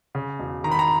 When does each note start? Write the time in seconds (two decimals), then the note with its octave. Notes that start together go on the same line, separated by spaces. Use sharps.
0.15 C#3
0.39 E1
0.64 D#3 A#5
0.71 B5
0.79 A#5